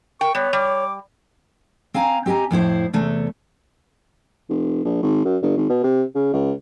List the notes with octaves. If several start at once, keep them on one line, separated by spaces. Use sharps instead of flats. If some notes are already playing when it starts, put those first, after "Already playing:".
A#4 G5 C#6
G3 B3 C#5
G3 D6
C4 F5 G#5 A#5
C4 G4 D#5 G#5 A#5
F2 A2 E4 C5
E2 C3 A3
F1
A#1
G#1
F#2
G1
G#1
B2
C3
C#3
C#2